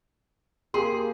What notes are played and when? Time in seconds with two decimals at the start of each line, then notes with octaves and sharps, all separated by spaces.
0.74 A#3 G4 G#4 C6